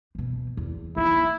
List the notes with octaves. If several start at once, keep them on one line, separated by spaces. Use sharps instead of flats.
F2 B2
E2
A#3 D#4 E4